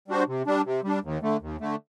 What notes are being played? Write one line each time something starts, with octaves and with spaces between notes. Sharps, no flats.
G3 D4 F#4 C5
C3
G3 D4
C3
G3 D4
D#2
D3 A3
D#2
D3 A3